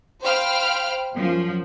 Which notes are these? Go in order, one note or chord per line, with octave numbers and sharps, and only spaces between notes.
C5 F5 G5 B5 F6
F#2 F3